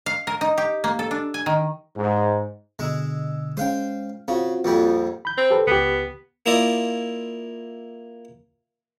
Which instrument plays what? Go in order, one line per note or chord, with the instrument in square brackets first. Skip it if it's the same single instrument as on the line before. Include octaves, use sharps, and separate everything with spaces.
[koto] F5
A#4
D#4
G4
A#3
A4
D4
G#5
D#3
[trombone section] G#2
[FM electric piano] B2 D3 E6 [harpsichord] G#3
[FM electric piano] G#3 C#4 [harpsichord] C5 F5 G5
[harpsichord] C#3 [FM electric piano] C4 F4 F#4
[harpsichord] A#1 F2 G3
[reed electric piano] B5 G6
[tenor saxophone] C4
[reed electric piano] G4 A4 B4
[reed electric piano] C#2 G4 [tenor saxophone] B3
[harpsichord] A#3 E4 F4 D5 D#5